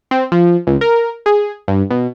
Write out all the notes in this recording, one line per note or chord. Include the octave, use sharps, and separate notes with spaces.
C4
F3
C#2
A#4
G#4
G2
B2